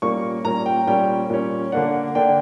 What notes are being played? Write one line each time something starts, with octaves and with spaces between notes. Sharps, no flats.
A#2 G3 A#3 C#4 C#6
A#2 G3 A#3 C#4 A#5
G5
A#2 G3 A#3 C#4 G5
A#2 G3 A#3 C#4
D3 A#3 D4 F#5
D3 A#3 D4 G5